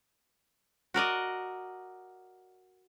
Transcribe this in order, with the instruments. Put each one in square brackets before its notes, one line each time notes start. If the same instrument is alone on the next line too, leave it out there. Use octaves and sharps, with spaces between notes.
[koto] F#4 A#4 D5 D#5